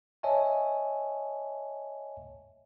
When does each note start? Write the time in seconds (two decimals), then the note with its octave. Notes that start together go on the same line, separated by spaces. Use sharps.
0.23 C#5 D#5 E5 G#5 A5